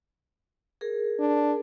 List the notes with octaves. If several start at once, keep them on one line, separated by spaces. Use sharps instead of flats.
G#4 A#4
D4